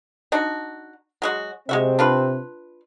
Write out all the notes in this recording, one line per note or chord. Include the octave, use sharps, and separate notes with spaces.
D4 D#4 F#4
F#3 G#3 F#4
C3 G#3 C4 F#4 E5
D4 F4 B4